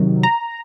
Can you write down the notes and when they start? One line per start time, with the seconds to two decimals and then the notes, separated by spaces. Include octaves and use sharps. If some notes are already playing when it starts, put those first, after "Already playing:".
Already playing: C3 D#3 F#3
0.23 A#5